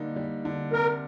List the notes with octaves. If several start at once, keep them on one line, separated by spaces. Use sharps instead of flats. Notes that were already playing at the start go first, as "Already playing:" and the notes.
Already playing: D3 G3 A#3 D#4
G3
D3
C3 A#4